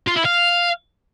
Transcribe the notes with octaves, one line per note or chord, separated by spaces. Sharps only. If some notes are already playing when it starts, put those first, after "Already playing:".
F4
E4
F5